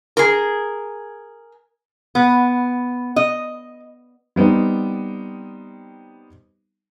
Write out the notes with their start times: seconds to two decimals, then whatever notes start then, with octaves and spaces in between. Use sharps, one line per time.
0.17 G#4 A#4
2.15 B3
3.16 D#5
4.36 G3 B3 C4 D#4